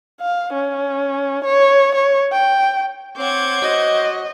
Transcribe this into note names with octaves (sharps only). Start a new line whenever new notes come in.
F5
C#4
C#5
C#5
G5
C4 C5 C#5 F#5 D6 G6 G#6
F#4 D#5